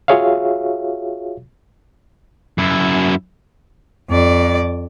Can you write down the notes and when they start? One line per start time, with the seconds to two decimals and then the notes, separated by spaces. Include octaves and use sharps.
0.08 F4 F#4 G#4 C#5 E5 F5
2.58 F#2 E4
4.10 F2 D5